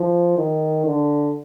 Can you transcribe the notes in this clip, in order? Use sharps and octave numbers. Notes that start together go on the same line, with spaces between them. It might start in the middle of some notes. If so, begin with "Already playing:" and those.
Already playing: F3
D#3
D3